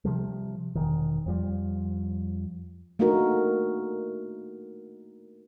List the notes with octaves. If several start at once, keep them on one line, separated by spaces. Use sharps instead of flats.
C3 F3 G3
E1 C2 D#3
F2 F3 G3
A3 A#3 D4 D#4 F#4 A#4